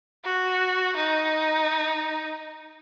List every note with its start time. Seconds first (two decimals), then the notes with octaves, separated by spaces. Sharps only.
0.24 F#4
0.96 D#4